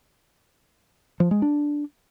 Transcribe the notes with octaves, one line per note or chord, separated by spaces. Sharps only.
F3
G#3
D4